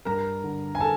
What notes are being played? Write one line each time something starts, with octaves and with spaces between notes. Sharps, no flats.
G2 A#4 A#5
D3
G#5
A4 A5